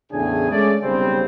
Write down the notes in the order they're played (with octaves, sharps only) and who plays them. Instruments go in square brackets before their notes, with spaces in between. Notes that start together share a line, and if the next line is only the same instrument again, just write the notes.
[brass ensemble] E2 A2 C#3 D4 G#4 G#5
G#3 A3 C#4 G#4 D5
B1 C#3 G3 C4